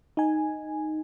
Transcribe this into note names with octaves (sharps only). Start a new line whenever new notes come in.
D#4 G#5